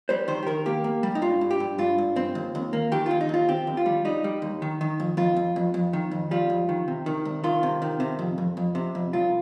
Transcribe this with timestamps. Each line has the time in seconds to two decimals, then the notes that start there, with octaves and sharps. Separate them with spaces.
0.09 G3 C5
0.28 D#3 C5
0.43 G4
0.47 D#3 A#4
0.66 A#3 G4
0.84 A#3
1.03 G3
1.15 D#4
1.22 G2 F4
1.41 G2
1.51 G4
1.60 G2
1.78 G2 F4
1.98 G2
2.16 C4
2.35 D#2
2.55 D#2
2.73 A#3
2.92 D#3 G4
3.06 D#2 F4
3.21 D#4
3.29 D#2 F4
3.49 C4 G4
3.67 D#2
3.77 F4
3.86 G3
4.05 G3 D#4
4.24 G3
4.42 D#2
4.62 D#3
4.81 D#3
5.00 F2
5.17 F2 F4
5.36 F2
5.56 F2
5.74 F2
5.93 D#3
6.11 F2
6.31 G3 F4
6.50 F2
6.69 D#3
6.88 C3
7.06 D#3
7.25 C2
7.44 D#3 F4
7.63 C3
7.82 D#3
8.00 C3
8.19 F2
8.38 F2
8.57 F2
8.75 C3
8.95 F2
9.13 C2 F4